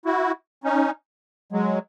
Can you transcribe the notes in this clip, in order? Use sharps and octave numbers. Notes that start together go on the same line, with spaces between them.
E4 F#4
C#4 D#4
F#3 G#3